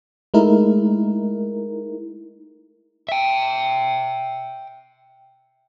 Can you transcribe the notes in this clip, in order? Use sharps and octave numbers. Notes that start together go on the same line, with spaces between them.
G#3 A3 D#4 E4 A#4
E5 G5